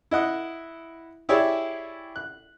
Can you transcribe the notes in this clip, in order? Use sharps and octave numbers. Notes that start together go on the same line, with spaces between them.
E4 D#5 F#5 D#6
E4 G4 G#4 C#5 D5 E5
F#6